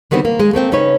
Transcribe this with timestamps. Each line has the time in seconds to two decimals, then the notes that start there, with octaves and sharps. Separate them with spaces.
0.11 D3 D#3 G3 B3 C4
0.25 A#3
0.39 G#3
0.53 A3 A#3 C4 G5
0.72 C#3 C#4 D#4 B4 C#5